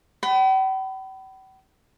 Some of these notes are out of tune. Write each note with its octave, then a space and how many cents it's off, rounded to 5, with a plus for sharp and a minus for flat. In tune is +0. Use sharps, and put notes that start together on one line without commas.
G5 -45 B5 +15